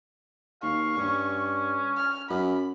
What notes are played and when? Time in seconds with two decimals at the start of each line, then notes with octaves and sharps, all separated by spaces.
0.62 D#2 F5 C#6
0.97 G2 C#4
1.97 F6
2.30 F#2 B5